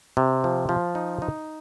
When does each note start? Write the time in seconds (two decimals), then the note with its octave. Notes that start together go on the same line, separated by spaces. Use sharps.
0.17 C3
0.44 F3
0.69 F3
0.95 D#4
1.22 D#4